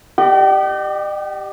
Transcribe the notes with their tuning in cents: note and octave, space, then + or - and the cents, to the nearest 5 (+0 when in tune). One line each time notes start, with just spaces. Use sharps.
G4 +5 D#5 -45 G5 -40